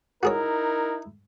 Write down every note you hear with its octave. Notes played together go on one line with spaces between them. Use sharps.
D#4 E4 F#4 G#4 A#4 C#5